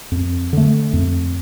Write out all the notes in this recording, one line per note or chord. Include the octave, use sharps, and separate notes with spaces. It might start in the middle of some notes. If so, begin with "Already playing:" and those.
F2
D3 A3
F2